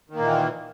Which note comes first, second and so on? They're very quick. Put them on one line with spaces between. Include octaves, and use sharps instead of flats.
D#3 A#3 A#2 E3